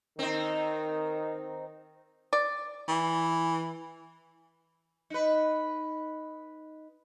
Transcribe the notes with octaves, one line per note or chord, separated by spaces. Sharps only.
D#3 C4 D#4
D5
E3
D#4 B4